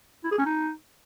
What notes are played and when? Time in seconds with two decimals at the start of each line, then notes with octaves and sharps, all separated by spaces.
0.24 E4
0.31 G#4
0.38 C#4
0.45 D#4